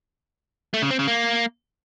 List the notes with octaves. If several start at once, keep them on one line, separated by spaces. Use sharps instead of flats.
A3
C#3
C4
C#3
A#3